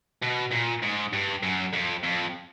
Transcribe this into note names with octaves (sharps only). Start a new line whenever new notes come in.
B2
A#2
G#2
G2
F#2
F2
F2